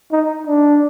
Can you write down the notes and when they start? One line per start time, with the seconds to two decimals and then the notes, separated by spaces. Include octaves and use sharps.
0.12 D#4
0.47 D4